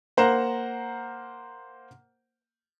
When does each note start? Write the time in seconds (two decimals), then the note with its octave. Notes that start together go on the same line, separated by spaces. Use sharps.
0.17 A#3 C5 F#5 A#5 E7